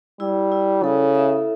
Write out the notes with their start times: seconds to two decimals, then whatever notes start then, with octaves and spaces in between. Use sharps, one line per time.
0.20 G3 E4
0.52 E4
0.83 C#3 A4
1.15 E5